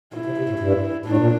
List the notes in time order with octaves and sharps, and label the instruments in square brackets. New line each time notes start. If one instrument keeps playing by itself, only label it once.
[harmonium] A#2 [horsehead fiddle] E4
[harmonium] C3
C3
A2
G2
[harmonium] A2 [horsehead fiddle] D4
[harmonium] A#2